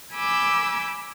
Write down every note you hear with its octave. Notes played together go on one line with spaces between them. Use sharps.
G#5 B5 D6 E6 G6